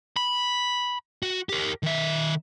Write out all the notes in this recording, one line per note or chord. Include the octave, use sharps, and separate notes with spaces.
B5
F#4
G4 A#4
D#3 E5